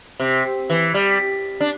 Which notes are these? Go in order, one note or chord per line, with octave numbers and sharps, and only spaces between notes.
C3
E3
G3
D4